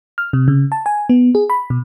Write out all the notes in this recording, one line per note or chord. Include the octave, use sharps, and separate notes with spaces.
F6
C3
C#3
A5
G#5
B3
G#4
B5
B2